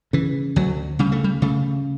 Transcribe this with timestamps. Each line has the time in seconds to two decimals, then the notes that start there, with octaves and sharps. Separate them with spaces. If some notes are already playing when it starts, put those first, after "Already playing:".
0.13 C#3 E3
0.56 D2 F#3
0.99 C#3 G3
1.12 A3
1.24 G3
1.42 C#3 A3